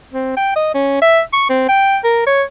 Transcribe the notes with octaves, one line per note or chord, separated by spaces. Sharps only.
C4
G5
D#5
C#4
E5
C#6
C4
G5
A#4
C#5